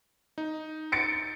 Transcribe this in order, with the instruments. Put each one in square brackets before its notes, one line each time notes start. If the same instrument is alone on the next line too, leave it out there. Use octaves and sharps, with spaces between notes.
[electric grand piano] D#4
[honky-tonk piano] A6 C#7 D7